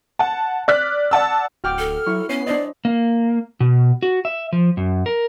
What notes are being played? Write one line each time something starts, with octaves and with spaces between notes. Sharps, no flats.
F#5 A5
D5 F6 F#6 B6
D5 F#5 A5 E6
D1 F#4 G5 D6 F6
A4
F#3 E4 C#6
B3 C#4 C#5 C7
D4 C5 D5 D#5
A#3
B2
F#4
E5
F3
F#2
A#4